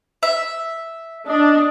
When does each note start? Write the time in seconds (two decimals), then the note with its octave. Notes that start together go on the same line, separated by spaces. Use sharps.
0.23 E5
1.28 D4 D#5